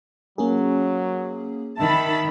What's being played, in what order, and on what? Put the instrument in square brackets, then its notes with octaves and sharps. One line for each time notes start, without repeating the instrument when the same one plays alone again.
[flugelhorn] F#3 [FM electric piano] A#3 C#4 G#4
[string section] D#3 [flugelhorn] E5 [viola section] A5 B5